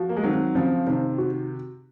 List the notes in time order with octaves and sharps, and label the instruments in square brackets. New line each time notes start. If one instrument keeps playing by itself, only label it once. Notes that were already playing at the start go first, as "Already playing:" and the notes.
Already playing: [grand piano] F3 [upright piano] F#4
[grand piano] A#3
G#3
[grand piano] D#3 F#3 [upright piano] C4
[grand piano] C#3 F3 [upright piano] C4
[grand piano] C3 D#3 [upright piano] C4
[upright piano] F#4